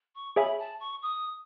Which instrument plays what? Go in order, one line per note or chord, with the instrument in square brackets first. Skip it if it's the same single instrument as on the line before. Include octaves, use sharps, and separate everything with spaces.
[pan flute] C#6
[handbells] G#4 C#5 E5 G#5 [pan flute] B5
[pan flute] A5
C#6
D#6